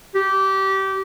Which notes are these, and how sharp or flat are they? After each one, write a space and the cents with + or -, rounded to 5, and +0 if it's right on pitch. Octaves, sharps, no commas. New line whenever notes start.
G4 -20